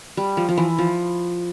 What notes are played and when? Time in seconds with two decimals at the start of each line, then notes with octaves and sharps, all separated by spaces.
0.17 G3
0.37 F3
0.49 F3
0.57 E3
0.78 F3